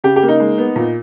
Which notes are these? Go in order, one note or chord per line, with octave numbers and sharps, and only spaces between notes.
C#3 G4
G4
A#3
D#4
G#3
B3
A#2